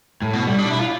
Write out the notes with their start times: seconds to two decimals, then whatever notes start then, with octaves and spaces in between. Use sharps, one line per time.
0.22 A2
0.33 B2
0.46 G3
0.58 D4
0.70 E4
0.79 F4